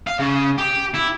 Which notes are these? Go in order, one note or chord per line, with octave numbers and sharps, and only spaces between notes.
F5
C#3
G4
E4